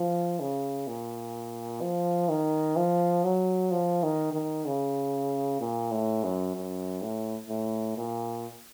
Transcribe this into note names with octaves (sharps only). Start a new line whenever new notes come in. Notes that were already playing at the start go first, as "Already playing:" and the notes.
Already playing: F3
C#3
A#2
F3
D#3
F3
F#3
F3
D#3
D#3
C#3
A#2
A2
F#2
F#2
A2
A2
A#2